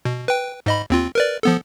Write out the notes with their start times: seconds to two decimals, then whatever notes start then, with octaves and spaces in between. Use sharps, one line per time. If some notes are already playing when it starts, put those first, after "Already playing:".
0.05 B2
0.28 B4 G5
0.66 G#2 D#5 B5
0.90 D#2 C4 F4
1.15 A#4 B4 D5
1.43 F3 B3 A4